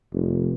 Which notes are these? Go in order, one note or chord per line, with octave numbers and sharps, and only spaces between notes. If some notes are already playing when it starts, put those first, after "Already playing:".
F1